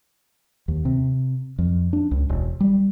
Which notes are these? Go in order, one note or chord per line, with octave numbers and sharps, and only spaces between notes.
D#2
C3
F2
D4
C#2
E1
G3